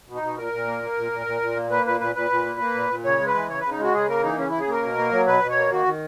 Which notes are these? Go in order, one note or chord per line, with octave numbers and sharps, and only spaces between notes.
B2
D#4
B2
A#2 A#4
A#2
A#3
A#3
A#2
A#2
A#2
A#2
A#3
A#3 B4
A#2 B4
A#2 B4
A#2 B4
A#2
A#3
A#3
A#2
A#2
C#3 C#5
G#3
B4
E3
C#3 C#5
C#3 B4
D#4
G#3 F#4
C#3 G#4
A#3 A#4
E3 D#4
C#3 C#4
C#3 E4
G#4
A#3 A#4
B2
A#3
F#3
B2 B4
B2
C#5
A#3
D#3 F#4
D#3